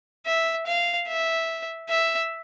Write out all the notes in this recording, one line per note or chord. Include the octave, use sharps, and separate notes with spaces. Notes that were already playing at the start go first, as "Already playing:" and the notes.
E5
F5
E5
E5